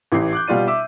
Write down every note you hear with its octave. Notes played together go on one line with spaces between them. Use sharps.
A1 E3 G4 C7
D6 F#6 G6
B2 G3 F4 D5 D#7
E5 D6 E6